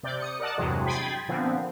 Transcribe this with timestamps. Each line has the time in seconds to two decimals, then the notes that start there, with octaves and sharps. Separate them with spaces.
0.03 C3 D5 G6
0.20 D#6 C#7
0.40 A#4 D5 D#5 F#5 A5
0.58 E2 G2 C3 F#3 G#3
0.86 G5 B5 C6 D#6 G#6 A6
1.28 A#2 D3 F3 B3 C4